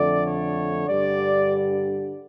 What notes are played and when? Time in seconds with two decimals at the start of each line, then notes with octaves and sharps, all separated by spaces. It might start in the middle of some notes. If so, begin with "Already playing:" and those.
Already playing: F2 D3 A3 D5
0.26 C#5
0.88 G2 D3 G3 D5